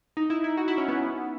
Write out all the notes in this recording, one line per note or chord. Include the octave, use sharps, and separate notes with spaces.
D#4
E4
E4
F#4
E4
C#4
B3